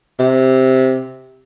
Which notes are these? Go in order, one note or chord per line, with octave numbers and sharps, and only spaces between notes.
C3